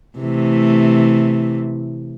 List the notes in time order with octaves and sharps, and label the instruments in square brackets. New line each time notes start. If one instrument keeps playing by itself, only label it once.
[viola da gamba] C3 E3 A3